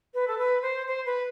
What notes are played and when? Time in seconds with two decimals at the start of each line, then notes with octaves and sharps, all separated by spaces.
0.14 B4
0.27 A4
0.38 B4
0.62 C5
0.87 C5
1.05 B4